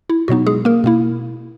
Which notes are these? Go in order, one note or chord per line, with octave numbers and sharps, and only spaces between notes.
E4
B2 F#3 B3 D#4 F#4
G#3 G#4
A#3 A#4
B2 A#3 E4